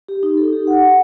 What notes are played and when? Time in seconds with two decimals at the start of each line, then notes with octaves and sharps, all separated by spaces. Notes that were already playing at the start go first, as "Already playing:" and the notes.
0.09 G4
0.23 D#4
0.38 A4
0.53 G4
0.67 F#5
0.82 F#5